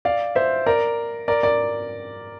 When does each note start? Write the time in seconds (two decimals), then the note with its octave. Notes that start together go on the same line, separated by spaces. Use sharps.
0.05 D5 F5
0.35 C5 E5
0.66 A#4 D5
1.28 A#4 D5
1.43 A#4 D5